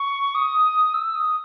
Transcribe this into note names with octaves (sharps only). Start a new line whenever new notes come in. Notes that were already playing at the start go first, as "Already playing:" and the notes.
Already playing: C#6
D#6
E6
D#6